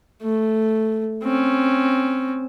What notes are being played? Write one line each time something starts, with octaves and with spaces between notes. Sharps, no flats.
A3
C4 C#4